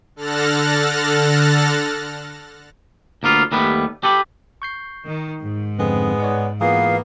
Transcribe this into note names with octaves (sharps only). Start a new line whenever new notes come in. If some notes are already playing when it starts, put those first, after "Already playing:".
D3 A4 F6 F#6 A6 A#6
D2 A#3 B3 F4
D#2 G3 A3 B3 B4
G4 A4 B4
C#6 G6 C7
D#3
G#2
F2 D3 G#3 B3 C4
C#5 D5 F#5
E3 A#3 B3 F4 G#4 F5